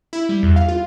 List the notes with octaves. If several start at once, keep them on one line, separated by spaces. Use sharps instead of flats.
E4
G3
E2
F5
F4